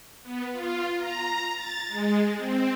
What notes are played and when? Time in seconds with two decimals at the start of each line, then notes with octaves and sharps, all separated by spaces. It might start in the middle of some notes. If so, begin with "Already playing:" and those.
0.23 B3
0.52 F4
0.98 A#5
1.54 A6
1.88 G#3
2.37 C4